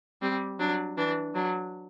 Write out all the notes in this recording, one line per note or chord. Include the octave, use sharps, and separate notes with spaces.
G3 C4
F#3 D4
E3 D4
F#3 D4